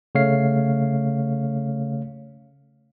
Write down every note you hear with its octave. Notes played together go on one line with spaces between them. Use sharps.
C#3 A3 C#5 F5 C7